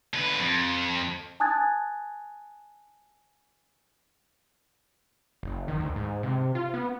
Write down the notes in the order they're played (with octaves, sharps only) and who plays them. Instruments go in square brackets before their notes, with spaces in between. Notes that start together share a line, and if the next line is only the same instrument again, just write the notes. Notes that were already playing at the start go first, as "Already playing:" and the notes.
[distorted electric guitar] D3 B4
F2
[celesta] G#5 A5 D#6 F#6 G#6 A6
[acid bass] F#1
D#3
D2
G#2
C3
F4
B3